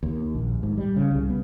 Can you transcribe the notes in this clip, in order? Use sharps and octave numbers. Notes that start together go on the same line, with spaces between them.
D#2
A#1
G#2
G3
C#3
C2
B3